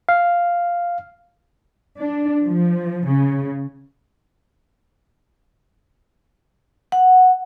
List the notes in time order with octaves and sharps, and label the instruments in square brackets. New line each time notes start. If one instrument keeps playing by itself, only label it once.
[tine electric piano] F5
[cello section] D4
F3
C#3
[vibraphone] F#5